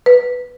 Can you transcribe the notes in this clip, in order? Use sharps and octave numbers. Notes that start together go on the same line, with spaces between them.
B4